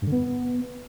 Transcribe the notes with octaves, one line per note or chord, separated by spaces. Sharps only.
G2
D3
B3